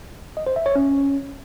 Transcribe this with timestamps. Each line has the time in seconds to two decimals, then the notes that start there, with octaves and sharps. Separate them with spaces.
0.37 D#5
0.47 C5
0.56 E5
0.66 C#5
0.75 C#4